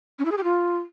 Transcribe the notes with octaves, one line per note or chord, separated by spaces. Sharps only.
C#4
E4
G#4
G4
F4